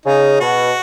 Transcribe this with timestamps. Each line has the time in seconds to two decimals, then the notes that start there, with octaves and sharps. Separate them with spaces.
0.05 C#3 D#4
0.40 B2 F#4